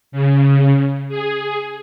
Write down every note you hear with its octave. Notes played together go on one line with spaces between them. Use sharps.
C#3
G#4